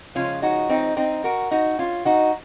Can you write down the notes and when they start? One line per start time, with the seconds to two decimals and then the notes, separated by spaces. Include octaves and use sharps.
0.15 C#3 F3 G#3 C#4 F4
0.42 D#4 F#4
0.69 C4 D#4
0.97 C4 D#4
1.24 F#4 A#4
1.51 D#4 F#4
1.79 C#4 F4
2.05 D#4 F#4